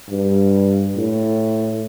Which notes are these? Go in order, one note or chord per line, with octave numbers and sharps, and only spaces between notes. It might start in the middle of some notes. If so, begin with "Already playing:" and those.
G2
A2